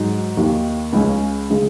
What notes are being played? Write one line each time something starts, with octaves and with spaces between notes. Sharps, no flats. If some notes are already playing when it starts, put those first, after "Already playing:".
Already playing: G#2 F#3 D#4
D#2 D#3 A#3
C#2 C#3 G#3 C#4
C#3 G#3